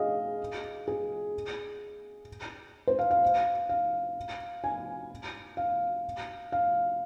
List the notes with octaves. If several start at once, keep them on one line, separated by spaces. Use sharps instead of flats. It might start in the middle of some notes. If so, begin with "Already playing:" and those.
Already playing: G#4 D#5 F5
G#4
C5
F5
F5
F5
G#5
F5
F5